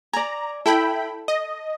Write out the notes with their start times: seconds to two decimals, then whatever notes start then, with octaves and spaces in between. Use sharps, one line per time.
0.13 D5 G#5 A#5
0.66 E4 A4 G5 B5
1.28 D#5